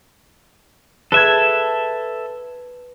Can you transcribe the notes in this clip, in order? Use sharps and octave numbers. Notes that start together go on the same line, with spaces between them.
A4 B4 E5 G#6